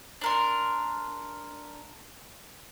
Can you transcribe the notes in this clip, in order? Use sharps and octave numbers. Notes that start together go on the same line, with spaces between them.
D4 A#4 C6